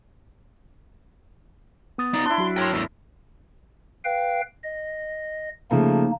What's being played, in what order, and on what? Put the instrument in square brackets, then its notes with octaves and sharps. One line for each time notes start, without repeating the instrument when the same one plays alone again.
[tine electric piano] B3 D#6 A6
[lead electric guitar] D#4 D5
[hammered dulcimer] D4 E4 [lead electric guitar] C6
[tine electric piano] F#3 F#4
[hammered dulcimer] A#4 C6 [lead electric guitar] C#5 G5
[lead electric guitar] E2 A2
[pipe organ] B4 F5 G5
D#5
[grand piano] C#3 F3 A3 [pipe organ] A#3 D#4